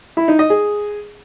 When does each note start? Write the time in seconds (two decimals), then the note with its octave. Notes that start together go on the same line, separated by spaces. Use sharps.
0.17 E4
0.28 D#4
0.39 D#5
0.50 G#4